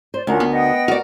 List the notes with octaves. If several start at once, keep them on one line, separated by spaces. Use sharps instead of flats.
C5 D5
D2 C#4 D4 F4 A#4 F#5
B3
D#5 F#5 G5
F#4 A#4 D5